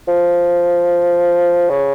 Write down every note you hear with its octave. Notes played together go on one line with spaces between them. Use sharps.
F3
C#3